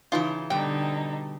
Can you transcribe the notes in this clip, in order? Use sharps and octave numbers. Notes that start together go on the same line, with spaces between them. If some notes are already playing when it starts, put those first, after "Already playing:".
C#3 E3 D#4 F4 A5
B2 D3 G3 D#4 G5